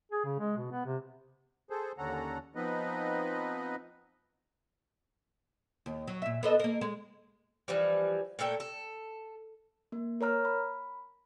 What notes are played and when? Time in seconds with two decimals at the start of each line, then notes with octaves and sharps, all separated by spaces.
0.12 G#4
0.25 C#3
0.39 G#3
0.57 B2
0.71 B3
0.86 C3
1.70 G#4 A4 C5
1.98 D#2 D3 C#4 A4 F#5 A#5
2.55 F3 B3 C4 D#4 B4 D#5
5.86 D#2
6.08 F#3
6.22 A#2 E5
6.43 B3 A4 D#5
6.59 A#3 A#4
6.81 G#3
7.68 E3 F3 G3
8.39 A#2 A3 A4 G5
8.60 A4
9.92 A#3
10.21 A#4 C#5 A#5 F6
10.45 B5